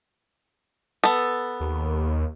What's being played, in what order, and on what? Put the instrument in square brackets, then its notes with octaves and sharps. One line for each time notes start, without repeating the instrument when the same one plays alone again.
[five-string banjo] B3 A4
[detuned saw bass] D#2